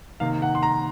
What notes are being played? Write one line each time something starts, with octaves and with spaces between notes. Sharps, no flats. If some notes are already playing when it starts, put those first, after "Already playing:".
C3 D#3 A#3 D#4 F5
F#5
C6
A#5